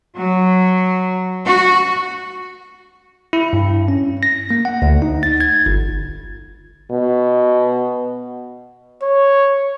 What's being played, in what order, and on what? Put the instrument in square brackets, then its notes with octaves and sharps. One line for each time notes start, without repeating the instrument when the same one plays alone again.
[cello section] F#3
F#4
[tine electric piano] E4
G2
C#4
A#6
A#3
F#5
D2
D#4
A6
G#6
G1
[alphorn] B2
[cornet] C#5